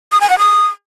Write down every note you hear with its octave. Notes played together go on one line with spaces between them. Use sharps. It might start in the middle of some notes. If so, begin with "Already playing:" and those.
D#6
G#5
F#5
D#6